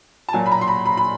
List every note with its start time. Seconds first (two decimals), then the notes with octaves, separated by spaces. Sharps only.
0.29 A5
0.33 A#2 F#3 A#3 G#5
0.46 B5
0.52 A#5
0.61 C6
0.68 B5
0.86 B5
0.97 B5